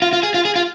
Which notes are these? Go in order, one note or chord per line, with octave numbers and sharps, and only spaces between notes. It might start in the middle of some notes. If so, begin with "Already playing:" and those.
F4
F4
G#4
F4
G#4
F4